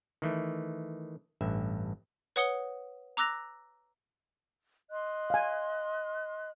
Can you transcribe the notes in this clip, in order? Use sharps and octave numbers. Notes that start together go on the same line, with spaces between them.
D#3 E3 A3
A1 G2 E5
B4 C#5 F#5 D#6 C#7 G7
A#5 D6 E6 F#6 A#6 F7
D#5 C6 F#6
F5 G#5